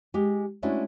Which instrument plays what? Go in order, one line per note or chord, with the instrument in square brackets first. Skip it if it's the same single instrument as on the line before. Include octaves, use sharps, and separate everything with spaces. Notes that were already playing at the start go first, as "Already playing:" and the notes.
[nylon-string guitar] G#3 G4
G#3 A3 C#4 D4 E4 F#4